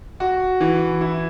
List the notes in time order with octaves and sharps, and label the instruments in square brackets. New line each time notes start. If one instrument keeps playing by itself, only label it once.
[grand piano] F#4
E3
E4